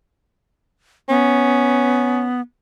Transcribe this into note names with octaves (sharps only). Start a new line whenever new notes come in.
B3 C#4